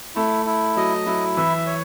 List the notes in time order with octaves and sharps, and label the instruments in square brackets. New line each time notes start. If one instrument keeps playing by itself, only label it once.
[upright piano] A3 [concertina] E4
[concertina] E4
[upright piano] F#3 [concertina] D#5
[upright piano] F#3 [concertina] E4
[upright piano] E3 [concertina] E5
[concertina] C#5